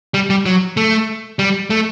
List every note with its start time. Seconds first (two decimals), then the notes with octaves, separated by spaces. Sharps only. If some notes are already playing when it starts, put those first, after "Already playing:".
0.14 G3
0.30 G3
0.46 F#3
0.77 A3
1.39 G3
1.70 A3